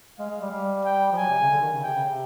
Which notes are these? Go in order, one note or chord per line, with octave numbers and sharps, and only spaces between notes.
G#3 F5
G#3
G3
G3
G5
F3
F#3 G#5
C3
C#3
D3
D#3
C#3
C3 G5
C#3
C3